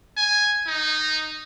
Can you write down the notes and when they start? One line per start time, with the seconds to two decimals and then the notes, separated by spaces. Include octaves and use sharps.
0.17 G#5
0.67 D#4